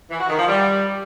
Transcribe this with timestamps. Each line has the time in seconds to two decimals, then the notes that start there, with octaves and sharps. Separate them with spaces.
0.11 E3
0.20 F#4
0.30 D#3
0.39 F3
0.48 G3